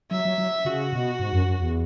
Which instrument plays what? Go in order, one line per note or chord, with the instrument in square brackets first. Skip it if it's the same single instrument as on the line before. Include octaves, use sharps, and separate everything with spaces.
[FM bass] F#3 [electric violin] E5
[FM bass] F#3
F#3
[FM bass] C#3 [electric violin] F#4
[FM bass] B2
G#2
F#2
F#2
E2